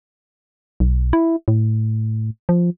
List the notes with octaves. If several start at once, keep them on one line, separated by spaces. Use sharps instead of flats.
B1
E4
A2
F3